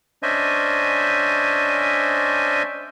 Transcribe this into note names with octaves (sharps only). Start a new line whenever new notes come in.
C#4 D4 C5 D#5 E5 G#5